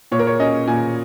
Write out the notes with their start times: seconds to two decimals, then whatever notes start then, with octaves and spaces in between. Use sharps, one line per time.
0.12 A#2 C#5
0.19 A#4
0.27 C#5
0.40 C#4 D#5
0.67 A#2 G#5